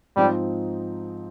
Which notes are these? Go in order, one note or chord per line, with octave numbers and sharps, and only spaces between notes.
G#2 F3 G3 C4 D#4